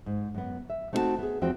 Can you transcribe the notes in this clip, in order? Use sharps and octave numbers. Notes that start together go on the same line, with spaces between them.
G#2
F#2 B3
E5
A3 C4 D#4 E4 F#4 A5
B3 G#4
E2 F3 C4 F#4 G5